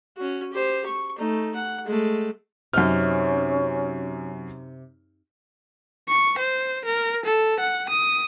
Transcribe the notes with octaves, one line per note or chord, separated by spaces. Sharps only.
C#4 F#4
G4 C5
C#6
A3 D#4
F#5
G#3 A3
F#2 C3 C#4 D#4 F6
C#6
C5
A#4
A4
F#5
D#6